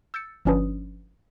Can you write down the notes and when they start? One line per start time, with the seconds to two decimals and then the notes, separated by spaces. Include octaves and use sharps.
0.14 E6 G6 A6 C#7
0.45 G1 F3 C#4 D4 B4 D#6